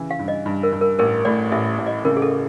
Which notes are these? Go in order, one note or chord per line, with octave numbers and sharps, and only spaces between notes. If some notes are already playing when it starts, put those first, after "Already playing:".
Already playing: C#3 E3
F5
G2
D#5
G2
A#4
G2
A#4
A1 A#4
A2 D5
A1 E5
A1
D#5
C#3 A#4
G#4
A4